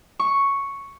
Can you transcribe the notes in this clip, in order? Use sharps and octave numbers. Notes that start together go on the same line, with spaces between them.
C#6